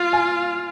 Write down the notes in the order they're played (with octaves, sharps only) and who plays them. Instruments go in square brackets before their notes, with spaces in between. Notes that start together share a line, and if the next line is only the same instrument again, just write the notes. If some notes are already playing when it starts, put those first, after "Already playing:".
Already playing: [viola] F4 [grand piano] F5
[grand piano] G#5